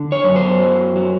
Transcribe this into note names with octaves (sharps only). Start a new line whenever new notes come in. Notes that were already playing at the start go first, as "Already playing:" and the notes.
Already playing: D3
C#5
F#2
C5
F#3
F#3